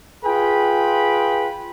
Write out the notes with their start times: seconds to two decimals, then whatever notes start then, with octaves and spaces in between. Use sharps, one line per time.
0.25 F4 G#4 B4 G5 B5